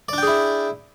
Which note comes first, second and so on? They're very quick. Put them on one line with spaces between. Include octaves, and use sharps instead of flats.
D5 D4 G5 G#4 E4